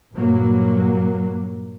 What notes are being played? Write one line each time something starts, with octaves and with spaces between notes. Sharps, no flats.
G2 A#2 F#3 A#3